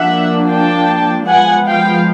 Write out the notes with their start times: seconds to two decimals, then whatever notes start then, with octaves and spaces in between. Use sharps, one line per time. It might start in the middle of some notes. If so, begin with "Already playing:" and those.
Already playing: F3 A#3 D4 E5 F#5
0.50 G5 A5
1.29 F3 G#3 B3 F#5 G#5
1.68 F5 G5